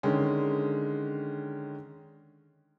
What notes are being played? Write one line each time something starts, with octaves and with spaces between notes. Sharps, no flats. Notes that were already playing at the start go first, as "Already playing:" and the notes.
D3 D#3 G#3 C#4